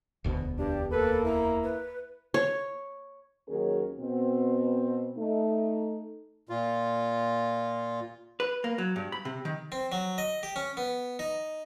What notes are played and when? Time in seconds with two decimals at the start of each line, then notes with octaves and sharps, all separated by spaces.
0.24 E1 D2 B2
0.59 G2 D4 G4
0.91 A#3 A4 B4
1.25 E4 A#5
1.63 B4
2.34 C#5
3.48 D#2 D#3 F#3 C#4 G#4 A#4
3.99 B2 C4
5.17 A3 D#4
6.49 A#2 F4
8.40 B4
8.64 A#3
8.78 F#3
8.96 G2
9.12 B5
9.25 C3
9.45 D#3
9.72 C4
9.92 F#3
10.18 D#5
10.43 G4
10.56 C#4
10.77 B3
11.19 D#4